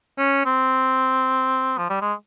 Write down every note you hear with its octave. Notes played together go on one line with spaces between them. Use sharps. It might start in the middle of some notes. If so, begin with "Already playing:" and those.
C#4
C4
F3
G3
G#3